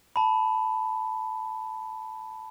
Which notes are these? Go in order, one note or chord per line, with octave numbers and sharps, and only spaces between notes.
A5 B5